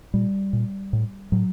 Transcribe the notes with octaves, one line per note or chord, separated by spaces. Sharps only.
A#2 G3
A#2
A2
A2 F#3